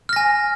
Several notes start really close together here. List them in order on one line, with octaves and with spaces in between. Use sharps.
F6 A#6 G#5